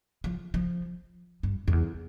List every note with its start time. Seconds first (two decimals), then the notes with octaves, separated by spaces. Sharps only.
0.24 F3
0.54 F3
1.43 G2
1.68 F2
1.73 E2